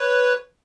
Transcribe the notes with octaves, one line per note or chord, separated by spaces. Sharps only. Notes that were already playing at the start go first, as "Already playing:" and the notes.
Already playing: B4 C#5